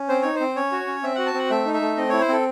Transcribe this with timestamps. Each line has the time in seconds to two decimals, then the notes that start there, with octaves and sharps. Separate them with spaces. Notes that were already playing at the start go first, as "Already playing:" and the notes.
Already playing: C#4
0.09 C4 C5
0.22 D#4 C#5
0.35 C5
0.40 C4
0.56 C#4 C#5
0.72 F#4
0.87 C#4
1.03 C4 E5
1.15 F#4 F#5
1.26 A5
1.34 C4 F#5
1.50 A3 E5
1.66 D#4
1.74 E5
1.81 A3
1.97 C4 D#5
2.09 E4 C#5
2.21 C5
2.28 C4 A4